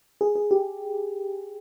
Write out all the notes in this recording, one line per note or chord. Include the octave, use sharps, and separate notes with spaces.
G#4
G#4
G4